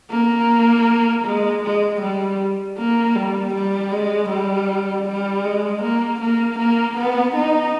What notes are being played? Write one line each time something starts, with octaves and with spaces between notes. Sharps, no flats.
A#3
G#3
G#3
G3
A#3
G3
G3
G#3
G3
G3
G#3
A#3
A#3
A#3
B3
D#4